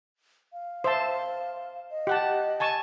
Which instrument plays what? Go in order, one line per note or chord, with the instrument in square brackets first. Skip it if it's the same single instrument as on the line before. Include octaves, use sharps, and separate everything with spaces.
[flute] F5
[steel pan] C5 E5 A5
[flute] D#5
[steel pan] G4 F#5 A5
G#5 A5 C#6